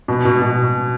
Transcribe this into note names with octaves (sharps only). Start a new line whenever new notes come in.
B2
B2
B2